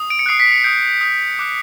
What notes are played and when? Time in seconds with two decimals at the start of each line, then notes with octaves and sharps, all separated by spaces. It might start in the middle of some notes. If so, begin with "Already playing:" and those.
Already playing: D#6
0.10 D7
0.19 C#7
0.26 D#6 F#6 C7
0.40 B6
0.51 B6 C#7
0.64 D#6 G6 C7 D7
1.01 D#6 G6
1.39 D6 F#6